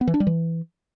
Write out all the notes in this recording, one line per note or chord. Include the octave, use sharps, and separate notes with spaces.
B3
E3
D4
G3
E3